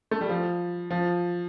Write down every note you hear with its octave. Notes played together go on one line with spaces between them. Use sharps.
A3
G3
F3
F3